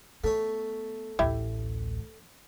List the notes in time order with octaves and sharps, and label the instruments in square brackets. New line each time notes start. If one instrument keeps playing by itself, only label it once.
[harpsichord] A3 C#5 [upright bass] B3
[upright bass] A1 D2 [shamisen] E4 G4 E5